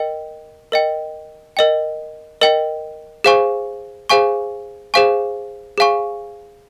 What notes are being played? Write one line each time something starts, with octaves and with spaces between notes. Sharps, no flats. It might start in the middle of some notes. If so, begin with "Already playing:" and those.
Already playing: A#4 D#5 G5
A#4 D#5 G5
A#4 D#5 G5
A#4 D#5 G5
G#4 C5 F5 G#5 C#6
G#4 C5 F5 G#5 C#6
G#4 C5 F5 G#5 C#6
G#4 C5 F5 G#5 C#6